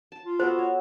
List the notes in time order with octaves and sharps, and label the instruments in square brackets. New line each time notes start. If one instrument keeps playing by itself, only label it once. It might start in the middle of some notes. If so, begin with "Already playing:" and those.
[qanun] A5
[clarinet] F4
[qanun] B3 F#4 A4 [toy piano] C5
[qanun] C#5